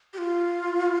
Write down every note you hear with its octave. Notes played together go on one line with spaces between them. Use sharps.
G4
F4